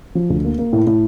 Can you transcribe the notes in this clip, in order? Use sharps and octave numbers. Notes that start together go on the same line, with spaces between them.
F3
D2
A#3
A#3
A2
A2